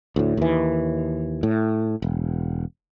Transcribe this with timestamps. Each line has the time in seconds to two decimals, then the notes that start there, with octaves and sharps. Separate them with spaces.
0.16 D2 A2
0.37 D#2 E3
1.43 A2
2.02 E1